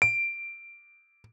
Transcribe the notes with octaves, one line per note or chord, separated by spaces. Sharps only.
D7